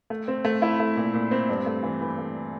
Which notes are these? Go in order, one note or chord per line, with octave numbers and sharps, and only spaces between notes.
A3
C4
A3
E4
A3
A#2
A#2
C4
G2
A3
E3
E3
A3